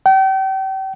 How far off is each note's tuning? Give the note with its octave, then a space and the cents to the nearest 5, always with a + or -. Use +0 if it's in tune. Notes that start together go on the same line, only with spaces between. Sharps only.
G5 -35